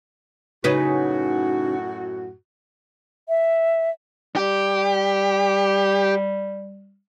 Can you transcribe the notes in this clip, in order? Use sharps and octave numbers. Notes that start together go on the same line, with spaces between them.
F#2 A2 C#3 D#4 F#4 B4
E5
G3 G4